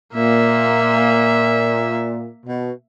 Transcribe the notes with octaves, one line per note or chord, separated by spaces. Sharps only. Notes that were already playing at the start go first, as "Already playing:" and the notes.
A#2 A#3 E5
B2